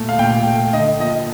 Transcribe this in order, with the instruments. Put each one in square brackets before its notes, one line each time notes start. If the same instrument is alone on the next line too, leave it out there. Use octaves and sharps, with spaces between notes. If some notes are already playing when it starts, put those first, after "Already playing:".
Already playing: [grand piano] A#2 A3
F5
A#2 G5
A3
D3 D#5
F3 A#3 D#5